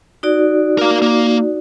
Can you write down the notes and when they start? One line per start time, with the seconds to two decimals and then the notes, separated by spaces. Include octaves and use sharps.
0.23 D#4 F#4 D5
0.78 A#4 F5
1.02 A#3